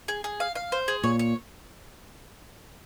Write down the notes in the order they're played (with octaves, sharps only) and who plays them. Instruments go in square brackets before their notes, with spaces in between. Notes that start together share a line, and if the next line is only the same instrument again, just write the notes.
[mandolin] G#4
G#4
F5
F5
C5
G#4
[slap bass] A#2 [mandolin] C#5
[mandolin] C#5